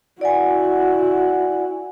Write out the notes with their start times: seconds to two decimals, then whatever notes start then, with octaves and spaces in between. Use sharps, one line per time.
0.21 E4 F#4 D5 F#5 G#5